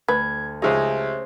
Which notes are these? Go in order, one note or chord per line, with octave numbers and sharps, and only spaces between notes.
D2 B4 G#6
C#2 F3 C#4 D#4 G4 G#4 C5 E5